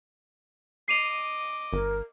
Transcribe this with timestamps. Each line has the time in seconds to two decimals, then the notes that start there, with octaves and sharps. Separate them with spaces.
0.88 D#5 D6 C7 D#7 F7
1.73 G1 A#4